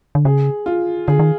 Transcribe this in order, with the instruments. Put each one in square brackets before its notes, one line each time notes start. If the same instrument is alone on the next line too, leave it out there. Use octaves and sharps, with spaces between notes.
[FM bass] D3
[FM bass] C#3 [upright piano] G#4
[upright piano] F4
[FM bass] D3 [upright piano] G#4
[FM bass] D#3